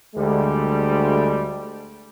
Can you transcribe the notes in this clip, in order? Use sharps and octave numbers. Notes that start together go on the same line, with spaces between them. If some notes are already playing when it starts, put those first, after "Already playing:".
D2 G3 G#3